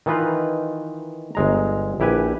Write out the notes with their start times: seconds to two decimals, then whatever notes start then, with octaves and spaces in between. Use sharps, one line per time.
0.06 D#3 E3 D#4 F4 B4
1.35 G1 G#3 A#5
2.00 A#1 E4 G4 B4 G#5